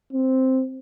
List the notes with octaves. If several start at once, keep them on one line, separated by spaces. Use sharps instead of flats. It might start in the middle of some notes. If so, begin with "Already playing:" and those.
C4